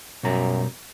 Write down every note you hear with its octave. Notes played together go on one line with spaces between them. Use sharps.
F#2 B2 G3 A#5